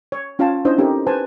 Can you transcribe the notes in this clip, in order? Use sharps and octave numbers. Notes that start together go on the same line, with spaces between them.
C#5
C#4 F4 C#5 F5 G5 A5
C#4 D4 E4 C5 C#5 D#5
C4 C#4 D#4 G4 A4 A#4
B4 C5 G#5 A5